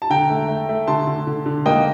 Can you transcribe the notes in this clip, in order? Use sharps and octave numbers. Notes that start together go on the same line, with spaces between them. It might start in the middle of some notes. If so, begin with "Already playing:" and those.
A5
D3 G5 A#5
A3
A3
A3
D3 A5 C6
D3
D3
D3
A#3 D#5 G5